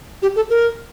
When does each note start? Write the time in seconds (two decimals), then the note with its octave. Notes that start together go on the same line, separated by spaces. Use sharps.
0.22 G4
0.36 A4
0.50 A#4